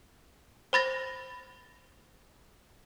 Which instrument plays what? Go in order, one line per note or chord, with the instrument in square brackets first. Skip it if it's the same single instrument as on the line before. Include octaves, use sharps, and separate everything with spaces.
[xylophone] C5 B5 A6 A#6